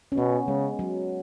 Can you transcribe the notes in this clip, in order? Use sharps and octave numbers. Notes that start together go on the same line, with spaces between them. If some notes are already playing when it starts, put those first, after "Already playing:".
C#4
B2 B3
C#3 G#3
F#3